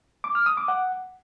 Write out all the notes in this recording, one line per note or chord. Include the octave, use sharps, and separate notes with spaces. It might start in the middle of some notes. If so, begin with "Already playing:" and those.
D6
F6
D#6
D6
F#5